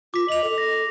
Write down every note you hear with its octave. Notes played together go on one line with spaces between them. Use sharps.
F4 D6 B6
D#5 F7 F#7
A4
A#6